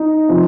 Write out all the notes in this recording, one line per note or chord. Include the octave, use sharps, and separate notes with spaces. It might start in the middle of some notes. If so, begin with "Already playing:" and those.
Already playing: D#4
C3 F3